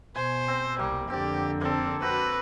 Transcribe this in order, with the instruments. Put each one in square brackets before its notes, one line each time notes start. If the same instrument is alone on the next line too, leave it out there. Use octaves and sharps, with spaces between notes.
[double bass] B2 [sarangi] C5 [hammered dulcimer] G#5
[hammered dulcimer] C4
[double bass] C2 [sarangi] G3 [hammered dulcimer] A#3
[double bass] F2 D3 [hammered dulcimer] C4 D5 [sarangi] G4
[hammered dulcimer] A#3 A4 [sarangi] C4
[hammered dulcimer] C4 F#4 [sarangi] B4